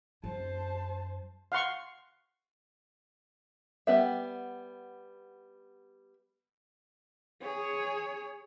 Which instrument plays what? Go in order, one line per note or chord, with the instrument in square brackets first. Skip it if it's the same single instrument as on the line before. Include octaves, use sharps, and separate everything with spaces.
[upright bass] F#2 [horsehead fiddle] C5 A5
[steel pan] F5 F#5 C6 C#6
[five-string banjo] G3 B3 E5
[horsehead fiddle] G#4 C#5